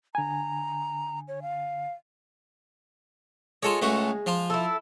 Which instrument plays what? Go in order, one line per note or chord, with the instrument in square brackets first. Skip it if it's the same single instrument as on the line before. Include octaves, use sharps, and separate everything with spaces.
[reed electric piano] D3 G#5 [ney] A#5
[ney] C#5
F5
[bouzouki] G#3 [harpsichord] F4 A4 C#5
[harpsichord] C#2 A3 F#4
F3 F4
[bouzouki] E4 A4